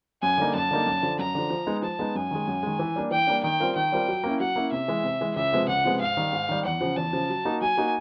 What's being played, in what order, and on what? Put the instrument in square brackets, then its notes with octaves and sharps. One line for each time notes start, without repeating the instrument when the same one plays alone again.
[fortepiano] F#2 [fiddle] G#5
[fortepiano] D3 G3 A#3 D#4
[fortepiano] F#2 [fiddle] A5
[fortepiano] D3 G3 A#3 D#4
F#2
D3 F3
[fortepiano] F#2 [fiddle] A#5
[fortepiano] D3 F3
F3
G#3 B3 D#4
[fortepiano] F3 [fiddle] A5
[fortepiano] G#3 B3 D#4
[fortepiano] F#2 [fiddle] G#5
[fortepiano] D#3 G#3
F#2
D#3 G#3
E3
G3 A#3 D4
[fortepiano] E3 [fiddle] G5
[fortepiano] G3 A#3 D4
[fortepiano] D#3 [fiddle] G5
[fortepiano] G3 C4 F4 A#4
[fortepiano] D#3 [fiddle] G5
[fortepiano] G3 C4 F4 A#4
F#3
A#3 C#4 E4
[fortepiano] F#3 [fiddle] F#5
[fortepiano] A#3 C#4 E4
[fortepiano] C3 [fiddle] E5
[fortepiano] E3 G#3
C3
E3 G#3
[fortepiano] C#2 [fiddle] E5
[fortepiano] C3 F3 G#3 B3
[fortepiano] C#2 [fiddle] F#5
[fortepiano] C3 F3 G#3 B3
[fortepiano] G#2 [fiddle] F5
[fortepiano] D#3 G3
G#2
D#3 G3
[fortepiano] E2 [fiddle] F#5
[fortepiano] C#3 F3
[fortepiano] E2 [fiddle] A5
[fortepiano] C#3 F3
F#3
A#3 D#4 F#4
[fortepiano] F#3 [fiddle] G#5
[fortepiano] A#3 D#4 F#4